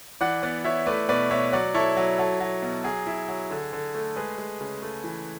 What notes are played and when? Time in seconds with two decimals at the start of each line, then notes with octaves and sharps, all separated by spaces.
0.21 E3 D5 F#5
0.43 B3 D5 F#5
0.64 E4 C#5 E5
0.86 A3 B4 D5
1.09 B2 B4 D5
1.31 B2 C#5 E5
1.53 F#3 D5 F#5
1.74 E4 A4 C#5
1.97 F#3
2.18 F#3 A4
2.40 F#3
2.62 B2
2.84 F#3 G#4
3.07 E4
3.28 F#3
3.51 D3
3.73 D3
3.95 A3
4.16 G#3 G#4 B4
4.38 G#3
4.61 C#3
4.82 A3
5.04 E3